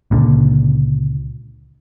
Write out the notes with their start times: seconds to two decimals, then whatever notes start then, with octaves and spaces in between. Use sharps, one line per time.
0.11 C#2 A#2 D3